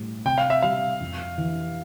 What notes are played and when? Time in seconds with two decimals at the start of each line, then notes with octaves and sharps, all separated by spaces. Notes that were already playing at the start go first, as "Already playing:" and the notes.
Already playing: A2 G3
0.25 C3 G5
0.38 F5
0.50 E5
0.62 G3 F5
1.01 F2
1.38 E3